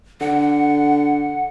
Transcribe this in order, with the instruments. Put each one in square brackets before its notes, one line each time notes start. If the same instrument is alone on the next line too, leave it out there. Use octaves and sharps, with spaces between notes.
[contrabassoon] D3 [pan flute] F#5